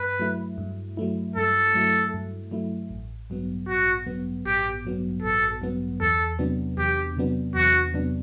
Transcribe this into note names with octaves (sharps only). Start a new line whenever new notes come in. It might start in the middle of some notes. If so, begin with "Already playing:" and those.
Already playing: G2 B4
F#3 A3 E4
G2
F#3 A3 E4
G2 A4
F#3 A3 E4
G2
F#3 A3 E4
A1
G2 F#3 B3
A1 F#4
G2 F#3 B3
A1 G4
G2 F#3 B3
A1 A4
G2 F#3 B3
E2 A4
C3 F#3 B3 D4
E2 G4
C3 F#3 B3 D4
E2 F#4
C3 F#3 B3 D4